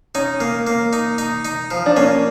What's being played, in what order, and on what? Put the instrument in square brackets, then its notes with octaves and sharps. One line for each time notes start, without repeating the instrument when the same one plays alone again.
[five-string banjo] C#4 [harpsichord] D#4
[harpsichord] A#3
A#3
D#4
D#4
D#4
F3
[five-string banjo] D4
[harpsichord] A#3 [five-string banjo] C#4